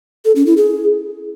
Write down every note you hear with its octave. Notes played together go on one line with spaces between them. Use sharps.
A4
C#4
E4
G#4